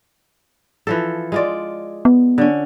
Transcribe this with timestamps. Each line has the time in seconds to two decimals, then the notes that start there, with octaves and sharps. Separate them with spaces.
0.87 E3 F3 A4
1.32 G#3 F4 D5
2.05 B3
2.38 D3 C#4